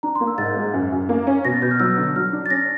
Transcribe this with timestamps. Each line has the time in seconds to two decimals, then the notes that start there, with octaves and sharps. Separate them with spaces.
0.03 D4 A#5
0.15 C6
0.21 A#3
0.27 E6
0.38 G#2 A6
0.57 G#3
0.74 F#2
0.92 F#2
1.09 A#3
1.27 C#4
1.45 B2 A#6
1.54 A6
1.62 B2 G6
1.71 F6
1.80 F#3 E6
1.98 D3
2.04 E6
2.16 F#3 F6
2.33 D4
2.46 A6
2.50 C#4 A#6